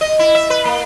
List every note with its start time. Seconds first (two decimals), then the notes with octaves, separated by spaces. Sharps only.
0.01 D#5
0.19 E4
0.35 E5
0.50 B4
0.65 A#3